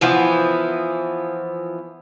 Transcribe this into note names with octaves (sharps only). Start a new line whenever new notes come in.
E3 F3 B3